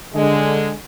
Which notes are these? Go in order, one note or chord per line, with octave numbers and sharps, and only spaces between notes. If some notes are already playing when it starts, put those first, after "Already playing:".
D3 G#3